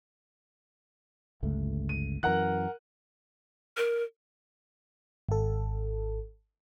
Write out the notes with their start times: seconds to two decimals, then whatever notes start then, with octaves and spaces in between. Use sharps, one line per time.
1.43 G1 C#2 A3
1.89 D#7
2.23 F#2 E3 A#4 F#5 F#6
3.77 A#4
5.29 G#1 A4